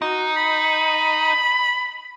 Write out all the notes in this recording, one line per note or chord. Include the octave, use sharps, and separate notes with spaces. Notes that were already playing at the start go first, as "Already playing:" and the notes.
D#4 F#4
B5